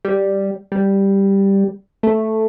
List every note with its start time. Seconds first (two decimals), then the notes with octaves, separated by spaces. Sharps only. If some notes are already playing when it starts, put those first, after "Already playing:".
0.05 G3
0.72 G3
2.03 A3